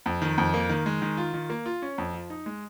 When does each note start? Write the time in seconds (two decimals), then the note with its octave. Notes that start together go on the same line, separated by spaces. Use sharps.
0.06 F2
0.22 D#3
0.38 F2
0.54 A#3
0.69 D#3
0.86 G#3
1.02 D#3
1.17 F4
1.34 D#3
1.50 A#3
1.66 F4
1.82 C#4
1.98 F2
2.14 F3
2.30 D#4
2.46 G#3